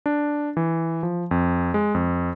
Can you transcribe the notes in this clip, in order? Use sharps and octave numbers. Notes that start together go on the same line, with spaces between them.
D4
E3
F3
F2
G#3
F2